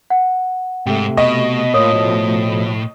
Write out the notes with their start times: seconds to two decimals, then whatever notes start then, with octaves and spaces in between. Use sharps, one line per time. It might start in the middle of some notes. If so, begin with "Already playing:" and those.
0.10 F#5
0.86 G#2 C3 A3 G5
1.17 B2 D#5 C#6
1.74 A2 A#3 F4 C#5 D#6
1.93 B2 F3 A3